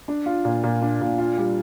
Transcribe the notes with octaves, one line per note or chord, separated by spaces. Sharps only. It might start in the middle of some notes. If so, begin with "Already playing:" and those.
D4
F4
A#2
A#2
D4
A#2
F4
G3